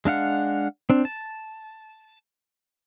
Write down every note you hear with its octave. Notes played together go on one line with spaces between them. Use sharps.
G#3 D4 F5 F#5
C4 D4
A5